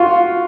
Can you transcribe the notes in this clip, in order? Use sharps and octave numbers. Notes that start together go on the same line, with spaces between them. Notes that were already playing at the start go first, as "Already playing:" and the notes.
Already playing: F4 F#4